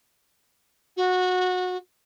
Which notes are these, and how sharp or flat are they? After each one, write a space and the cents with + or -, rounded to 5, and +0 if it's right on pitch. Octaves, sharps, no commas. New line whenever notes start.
F#4 -20